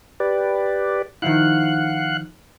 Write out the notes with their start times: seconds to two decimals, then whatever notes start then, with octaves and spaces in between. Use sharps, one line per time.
0.20 G4 B4 D5
1.22 D#3 F3 E4 F5 F#5 F#6